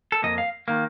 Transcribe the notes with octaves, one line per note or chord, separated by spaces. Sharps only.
A4
F2 D#3 A#3 D#5
F5
D#3 A#3